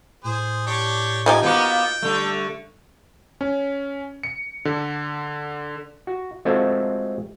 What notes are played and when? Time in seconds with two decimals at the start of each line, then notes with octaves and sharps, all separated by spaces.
0.24 A2 G#4 C5
0.67 D4 G4 C#5
1.26 F3 D#4 F#4 G4 G#5
1.42 A#3 B3 F#4 G5 D#6
2.02 D3 G3 A3
3.41 C#4
4.23 C#7
4.65 D3
6.07 F#4
6.45 G#3 A3 C4 F4 F#4 A4